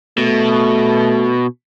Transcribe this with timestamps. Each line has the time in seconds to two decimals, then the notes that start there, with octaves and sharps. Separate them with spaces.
0.18 B2 A3